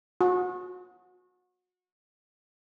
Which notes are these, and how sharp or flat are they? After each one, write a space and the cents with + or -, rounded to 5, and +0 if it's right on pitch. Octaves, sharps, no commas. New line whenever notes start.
F#4 -30